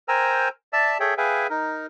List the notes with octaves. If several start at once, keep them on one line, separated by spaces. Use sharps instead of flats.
A#4 C5 G5 G#5 A#5 E6
D5 E5 A5 E6
G#4 A4 C#5 E5 G5
G#4 B4 E5 F5 G5 G#5
D#4 A#4